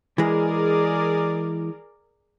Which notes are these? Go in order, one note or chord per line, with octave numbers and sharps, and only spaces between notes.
E3 G#3 G#4 A#4 D5